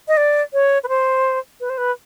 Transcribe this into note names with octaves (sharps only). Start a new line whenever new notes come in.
D#5
D5
C#5
B4
C5
B4
C5
B4